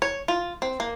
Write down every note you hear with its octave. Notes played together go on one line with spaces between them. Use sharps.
C#5
F4
C4
A#3